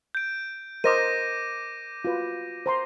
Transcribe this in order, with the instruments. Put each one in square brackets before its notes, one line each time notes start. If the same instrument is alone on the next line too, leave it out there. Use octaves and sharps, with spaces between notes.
[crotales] G6 D7
[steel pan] A#4 C5 D#5 [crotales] D6 A#6 D#7
[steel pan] F4 F#4 B4
C5 A#5 C6